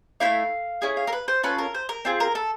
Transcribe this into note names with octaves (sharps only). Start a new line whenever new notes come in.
A3 C4 E4 F5
C#4 E4 G#4
F5
A#4
B4
C5
C#4 F4 A4 B4
A#4
C5
A#4
C4 F4 G#4
A#4
A4